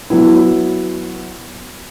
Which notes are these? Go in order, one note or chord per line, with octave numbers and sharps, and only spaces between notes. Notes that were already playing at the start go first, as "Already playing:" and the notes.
F#3 B3 E4